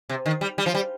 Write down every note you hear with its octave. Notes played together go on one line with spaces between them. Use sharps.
C3
D#3
G3
G3
F3
G3